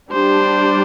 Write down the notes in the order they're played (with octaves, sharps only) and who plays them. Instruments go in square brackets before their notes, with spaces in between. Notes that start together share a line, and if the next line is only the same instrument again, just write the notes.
[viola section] G3 D4 G4 D5 [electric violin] C5